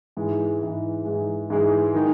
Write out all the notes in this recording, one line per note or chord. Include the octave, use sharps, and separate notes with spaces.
G#2 E3 G#3
G#2 E3 G#3
G#2 E3 G#3
G#2 E3 G#3
D#3 G#3 D#4 G#4